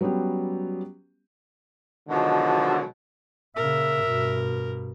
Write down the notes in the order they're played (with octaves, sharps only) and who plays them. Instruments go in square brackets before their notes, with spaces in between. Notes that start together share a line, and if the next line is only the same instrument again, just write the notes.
[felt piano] F#3 G3 B3 C#4 G4
[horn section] B2 D3 D#3 F3 F#3 G#3
[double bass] A#2 C#3 [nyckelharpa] A#4 [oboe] E5
[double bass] G2 B2